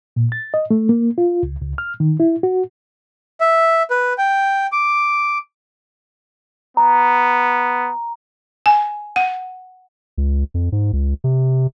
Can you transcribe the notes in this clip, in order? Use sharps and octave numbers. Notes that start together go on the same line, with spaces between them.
A#2
A6
D#5
A3
A#3
F4
C#2
C#2
F6
D#3
E4
F#4
E5
B4
G5
D6
B3 A#5
G#5
F#5
C#2
F2
G#2
C#2
C3